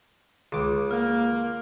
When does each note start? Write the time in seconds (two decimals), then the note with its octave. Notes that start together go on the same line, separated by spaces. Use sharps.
0.52 C#2 D6
0.91 A#3 F6